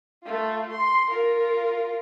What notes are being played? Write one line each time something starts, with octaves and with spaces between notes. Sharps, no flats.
A3 F4
C6
F4 A#4